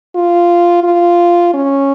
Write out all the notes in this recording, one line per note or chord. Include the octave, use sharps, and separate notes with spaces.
F4
F4
C#4